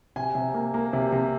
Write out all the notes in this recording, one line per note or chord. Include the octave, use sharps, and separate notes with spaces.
C3 G#5
C3
A#3
A#3
C3
C3